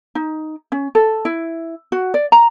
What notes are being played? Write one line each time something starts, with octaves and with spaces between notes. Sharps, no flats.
D#4
C#4
A4
E4
F#4
D5
A#5